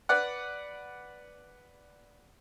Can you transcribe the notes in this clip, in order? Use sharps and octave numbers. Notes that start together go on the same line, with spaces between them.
B4 D5 F#5